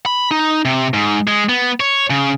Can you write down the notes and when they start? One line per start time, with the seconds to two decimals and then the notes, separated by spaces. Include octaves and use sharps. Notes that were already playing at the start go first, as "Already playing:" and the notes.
0.06 B5
0.31 D#4
0.65 C3
0.94 G#2
1.27 G#3
1.49 B3
1.80 C#5
2.10 C#3